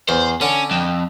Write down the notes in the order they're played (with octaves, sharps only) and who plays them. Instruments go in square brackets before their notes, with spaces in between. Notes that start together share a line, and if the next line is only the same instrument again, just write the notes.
[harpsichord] E2 [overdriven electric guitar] C5
[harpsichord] D3 [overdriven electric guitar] C#4
[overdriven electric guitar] F2